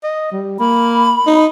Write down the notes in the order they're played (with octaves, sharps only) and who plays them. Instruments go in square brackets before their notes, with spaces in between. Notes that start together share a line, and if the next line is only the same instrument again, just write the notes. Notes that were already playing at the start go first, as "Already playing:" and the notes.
[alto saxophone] D#5
G3
[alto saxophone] A#3 [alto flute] B5
[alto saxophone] D#4